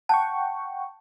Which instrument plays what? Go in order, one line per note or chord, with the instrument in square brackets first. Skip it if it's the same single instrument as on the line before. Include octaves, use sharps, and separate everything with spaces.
[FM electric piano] F#5 G5 C#6 [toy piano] A5